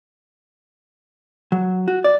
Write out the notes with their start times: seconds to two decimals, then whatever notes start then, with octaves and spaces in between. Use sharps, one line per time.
1.52 F#3
1.88 F#4
2.04 D5